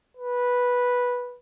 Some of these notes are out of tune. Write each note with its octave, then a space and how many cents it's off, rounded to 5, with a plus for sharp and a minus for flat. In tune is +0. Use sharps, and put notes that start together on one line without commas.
B4 -10